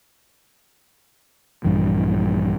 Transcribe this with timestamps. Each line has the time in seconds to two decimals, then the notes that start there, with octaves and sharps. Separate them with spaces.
1.64 A#1 G2 E3